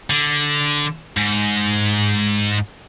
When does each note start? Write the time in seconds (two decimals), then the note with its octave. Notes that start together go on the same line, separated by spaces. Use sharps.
0.10 D3
1.17 G#2